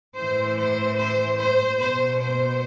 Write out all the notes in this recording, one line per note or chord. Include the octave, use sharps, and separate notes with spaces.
A2 E3 C5
C5
C5
C5
B2 C5
C5